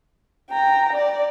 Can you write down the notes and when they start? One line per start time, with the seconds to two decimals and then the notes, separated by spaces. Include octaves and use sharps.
0.51 G5 A#5
0.93 D5